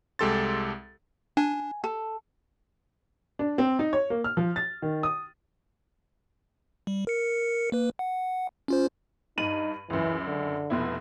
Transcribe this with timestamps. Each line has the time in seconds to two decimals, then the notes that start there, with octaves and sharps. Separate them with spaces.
0.19 C2 G#3 G4 A4 C6 A6
1.37 D4 G#5
1.84 A4
3.39 D4
3.58 C4
3.79 D#4
3.93 C#5
4.10 A#3
4.24 F6
4.37 F3
4.56 A6
4.82 D#3
5.03 D#6
6.87 G3
7.07 A#4 C#7
7.72 A#3 B4
7.99 F#5
8.68 C#4 F4 C5
9.38 G2 D#4 D#7 F#7
9.90 C#2 F#2 E3
10.27 D3
10.70 F1 B2 E4